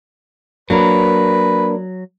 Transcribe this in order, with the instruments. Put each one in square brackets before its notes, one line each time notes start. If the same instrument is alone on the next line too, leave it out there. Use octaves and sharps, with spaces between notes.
[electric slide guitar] F#3 [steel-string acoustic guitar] A#3 D4 A#4 [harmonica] B4